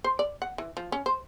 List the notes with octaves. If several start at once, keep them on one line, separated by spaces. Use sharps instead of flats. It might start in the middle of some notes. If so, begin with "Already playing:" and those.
C5
D5
F#5
E3
F3
C#4
C5